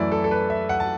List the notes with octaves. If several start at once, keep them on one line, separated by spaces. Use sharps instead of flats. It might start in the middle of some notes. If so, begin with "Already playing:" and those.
Already playing: F#2 E3 A3 E4 D5 E5
A4
A4
B4
E5
F#5
A5